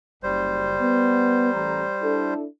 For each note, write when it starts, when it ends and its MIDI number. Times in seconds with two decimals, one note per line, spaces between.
0.23 0.78 30
0.23 2.34 55
0.23 2.34 72
0.80 1.50 59
1.53 1.83 33
1.53 1.83 82
2.02 2.45 62
2.02 2.45 64
2.02 2.45 69